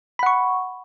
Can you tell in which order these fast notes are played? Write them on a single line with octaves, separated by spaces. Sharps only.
B5 F#5 C#6